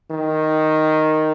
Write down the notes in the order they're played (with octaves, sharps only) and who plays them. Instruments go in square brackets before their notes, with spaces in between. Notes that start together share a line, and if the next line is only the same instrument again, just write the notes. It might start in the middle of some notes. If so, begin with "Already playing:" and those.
[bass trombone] D#3